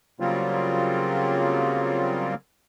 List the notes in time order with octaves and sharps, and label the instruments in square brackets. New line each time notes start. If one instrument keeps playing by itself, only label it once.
[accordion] C#3 F#3 G3 A#3 C4 F4